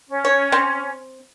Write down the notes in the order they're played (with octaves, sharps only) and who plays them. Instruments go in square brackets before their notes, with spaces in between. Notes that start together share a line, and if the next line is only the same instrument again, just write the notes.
[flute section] C#4
[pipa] C#5
C4